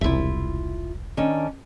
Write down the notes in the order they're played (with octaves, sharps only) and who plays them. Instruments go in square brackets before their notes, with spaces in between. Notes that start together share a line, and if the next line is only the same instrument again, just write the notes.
[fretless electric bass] E1 C2 [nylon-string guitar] E4 F4 E5
[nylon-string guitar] D#3 C#4 D4